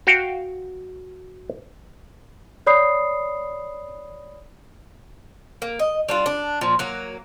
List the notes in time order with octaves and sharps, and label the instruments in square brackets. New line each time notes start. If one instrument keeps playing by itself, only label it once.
[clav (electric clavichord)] F#4 F5 G5
[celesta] C#5 D5 B5 D#6 C7
[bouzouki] A#3
D#5
G3 D4 F4
D4
A#2 F3
F#3 A#3